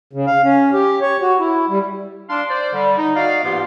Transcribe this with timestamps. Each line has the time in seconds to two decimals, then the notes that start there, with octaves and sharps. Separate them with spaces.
0.13 C#3
0.27 F5
0.43 C#4
0.73 G4
1.01 C#5
1.22 F#4
1.39 E4
1.69 G3
2.29 D4 F5 C6
2.50 C5 D5
2.73 D3 G3
2.98 D#4
3.16 F#4 D5 D#5 F5
3.42 G#2 E3 A#3 B3 F4 G4